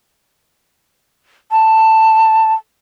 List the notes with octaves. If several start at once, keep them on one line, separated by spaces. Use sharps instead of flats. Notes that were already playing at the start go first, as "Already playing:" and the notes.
A5